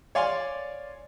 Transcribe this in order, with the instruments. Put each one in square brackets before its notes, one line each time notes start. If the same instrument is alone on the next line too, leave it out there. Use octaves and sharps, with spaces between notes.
[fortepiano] C#5 D5 F5 G#5 C6